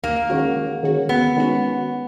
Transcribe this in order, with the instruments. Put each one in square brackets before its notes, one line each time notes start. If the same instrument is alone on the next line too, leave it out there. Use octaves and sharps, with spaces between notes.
[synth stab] D#2 [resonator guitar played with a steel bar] A#3
[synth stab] D#3 G#3 C#4 F#4
D#2
D#3 G#3 C#4 F#4
[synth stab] D#2 [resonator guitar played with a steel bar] B3
[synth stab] D#3 G#3 C#4 F#4